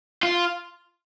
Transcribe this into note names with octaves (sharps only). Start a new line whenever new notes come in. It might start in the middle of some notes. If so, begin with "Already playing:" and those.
F4